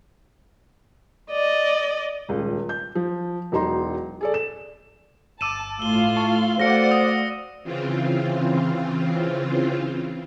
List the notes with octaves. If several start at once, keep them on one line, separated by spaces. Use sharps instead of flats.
D5 D#5
D#1 C#2
G6
F3
E1 F#3 D#4 A#5 C6
G#4 A4 D5
E7
G1 A5 D6 E6 D#7 E7
A2 F4 F5 E6 G7
A5 C#6
A3 F#4 C5 D5 F5 F#5 A#6 C#7
D#6
C#3 E3 C4 F4